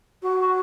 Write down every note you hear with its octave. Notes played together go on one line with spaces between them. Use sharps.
F#4